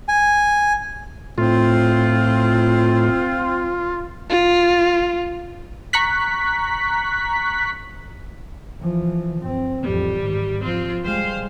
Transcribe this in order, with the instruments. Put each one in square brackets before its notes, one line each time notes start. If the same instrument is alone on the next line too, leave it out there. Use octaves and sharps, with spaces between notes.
[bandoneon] G#5
[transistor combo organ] A2 [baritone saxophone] C4 [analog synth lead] F4
[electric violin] F4
[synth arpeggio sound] A#5 C#6 F#6 B6
[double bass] E3 F3
G2 C4
[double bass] A1 F2 [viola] G3
[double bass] G#2 D#3
[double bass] F3 [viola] C4 F4
[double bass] G3 G#3 [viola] C5 F5